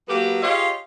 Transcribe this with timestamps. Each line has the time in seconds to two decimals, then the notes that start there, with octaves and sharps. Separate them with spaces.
0.08 F#3 A#3 B3 G4 A4 B4
0.43 F4 G4 G#4 C#5 D#5 F5